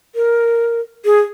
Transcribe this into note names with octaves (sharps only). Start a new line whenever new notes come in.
A#4
G#4